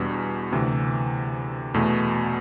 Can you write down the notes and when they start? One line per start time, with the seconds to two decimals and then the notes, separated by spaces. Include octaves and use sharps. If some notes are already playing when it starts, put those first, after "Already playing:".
Already playing: E2 B2 G3 D4
0.52 D2 C3 E3
1.74 E2 B2 A3